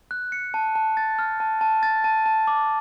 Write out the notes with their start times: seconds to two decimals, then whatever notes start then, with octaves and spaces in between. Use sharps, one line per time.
0.11 F#6
0.32 C#7
0.54 A5
0.75 A5
0.97 A6
1.19 F6
1.40 A5
1.61 A5
1.83 A6
2.04 A5
2.26 A5
2.47 D6